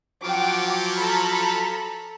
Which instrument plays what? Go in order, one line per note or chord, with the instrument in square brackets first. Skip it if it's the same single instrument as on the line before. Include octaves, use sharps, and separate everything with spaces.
[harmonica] F3 F#3 [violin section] F#5 G5 D6
[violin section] A4 A#5 B5